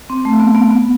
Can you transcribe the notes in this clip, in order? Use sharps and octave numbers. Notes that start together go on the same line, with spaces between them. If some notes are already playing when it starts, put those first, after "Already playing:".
C4
A3
B3
B3
B3